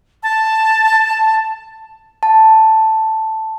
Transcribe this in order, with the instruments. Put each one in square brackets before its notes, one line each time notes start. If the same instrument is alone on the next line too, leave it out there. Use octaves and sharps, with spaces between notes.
[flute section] A5
[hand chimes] A5